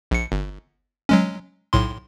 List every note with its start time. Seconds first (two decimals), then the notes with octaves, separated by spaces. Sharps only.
0.11 A#1 C#7
0.32 G1
1.09 F#3 G#3 C#4
1.73 B1 A2 C6